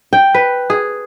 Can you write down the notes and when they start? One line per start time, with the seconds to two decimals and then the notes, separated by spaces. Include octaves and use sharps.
0.13 G5
0.34 B4
0.70 G#4